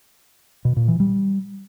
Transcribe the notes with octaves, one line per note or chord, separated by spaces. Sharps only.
B2
A#2
E3
G3